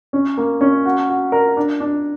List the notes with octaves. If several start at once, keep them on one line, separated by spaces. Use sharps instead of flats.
C#4
A#3
C#4
F#4
F#4
A#4
D4
D4